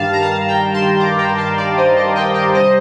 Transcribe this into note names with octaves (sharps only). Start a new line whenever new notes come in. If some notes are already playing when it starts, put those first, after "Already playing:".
Already playing: G2 D#3 G3 F5 A5
A#5
F5 A5
G5 A#5
A5 C6
A#5 D6
G5 A#5
F5 A5
D5 F5
C5 D#5
C5 D#5
D#5 G5
D#5 G5
C3 G3 C5 D#5